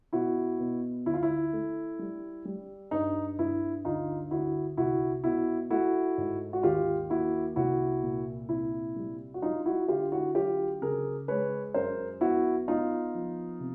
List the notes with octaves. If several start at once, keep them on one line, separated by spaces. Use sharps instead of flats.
B2 E4 F#4
B2
D2 E4
F4
E4
A3
G3
G3
G2 D#4
G2 E4
D2 D#4 F4
D2 E4 F#4
C2 E4 F#4
B2 E4 F#4
A3 E4 F#4
G#2
F#4
D#2 F4 G4
A#3 E4 F#4
C2 E4 F#4
A#2
C3 E4
G3
F#4
G3 D#4 F4
E4 F#4
D3 F4 G4
E4 F#4
F#3 F4 G4
C#3 G#4 A#4
G#3 B4 C#5
F#2 A#4 C5
B3 E4 F#4
B3 D#4 F4
F3
C3